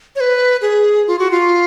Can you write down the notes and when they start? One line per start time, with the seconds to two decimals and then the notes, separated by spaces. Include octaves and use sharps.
0.16 C#5
0.20 B4
0.61 G#4
1.07 F4
1.19 F#4
1.31 F4